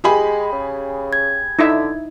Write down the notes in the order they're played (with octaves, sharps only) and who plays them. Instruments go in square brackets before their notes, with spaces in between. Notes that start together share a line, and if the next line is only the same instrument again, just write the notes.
[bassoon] G#3 [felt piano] G4 G#4 B5
[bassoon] C#3
[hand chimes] G#6
[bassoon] D3 [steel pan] D#4 E4 E5